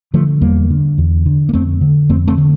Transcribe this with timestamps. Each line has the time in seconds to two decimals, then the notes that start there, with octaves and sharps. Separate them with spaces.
0.14 D3 F3 A3
0.41 E2 G3 A#3
0.70 D3
0.98 E2
1.26 D3
1.49 A#3
1.53 F2 A3 C4
1.81 D3
2.09 F2 A3 C4
2.27 A3 C4
2.38 D3